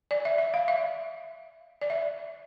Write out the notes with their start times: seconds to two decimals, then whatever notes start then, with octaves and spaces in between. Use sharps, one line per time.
0.11 D5
0.25 E5
0.38 E5
0.54 F5
0.68 E5
1.81 D5
1.90 E5